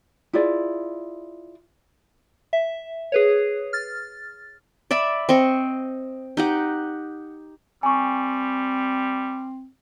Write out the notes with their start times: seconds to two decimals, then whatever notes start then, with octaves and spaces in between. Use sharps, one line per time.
0.33 E4 F4 G#4 D5
2.53 E5
3.12 G#4 B4 C#5
3.73 F6 A6
4.91 D5 E5 B5
5.29 C4 D#5 C#6
6.37 D#4 G4 F#5
7.83 G3 C4 G#5 C#6